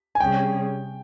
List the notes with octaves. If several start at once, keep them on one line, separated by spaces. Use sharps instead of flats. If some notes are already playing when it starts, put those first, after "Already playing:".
G#5
C3 G3 C#4 G#4 G5